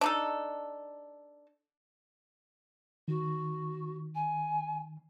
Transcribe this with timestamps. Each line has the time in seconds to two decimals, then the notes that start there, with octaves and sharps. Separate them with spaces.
0.01 D4 D#4 A4
3.08 D#3 F#4
4.15 G#5